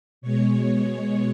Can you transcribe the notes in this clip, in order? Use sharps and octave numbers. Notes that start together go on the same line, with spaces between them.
B2 G#3 C#5
B2 G#3